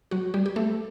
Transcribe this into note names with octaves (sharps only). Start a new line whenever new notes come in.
F#3 F#4
G3 G4
G4
A3 A4